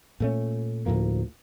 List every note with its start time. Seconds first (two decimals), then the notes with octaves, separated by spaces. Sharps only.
0.20 A#2 A3 C#4
0.86 D2 A2 F3 A#3